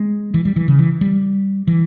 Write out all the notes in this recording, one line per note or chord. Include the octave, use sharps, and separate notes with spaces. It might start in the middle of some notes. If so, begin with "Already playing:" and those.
Already playing: G#3
E3
G3
E3
C#3
E3
G3
E3